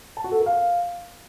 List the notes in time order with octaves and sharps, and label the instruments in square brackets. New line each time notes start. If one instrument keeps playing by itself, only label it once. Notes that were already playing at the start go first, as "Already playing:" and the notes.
[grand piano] A5
F#4
A4
A#4
F5